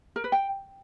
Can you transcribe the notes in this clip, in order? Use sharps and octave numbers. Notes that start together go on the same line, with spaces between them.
A#4
B4
G5